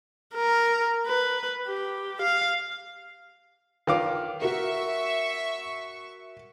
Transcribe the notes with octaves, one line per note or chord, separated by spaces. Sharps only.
A#4
B4
G4
F5
D#3 F4 B4 D6
F#4 A#4 E5 C#6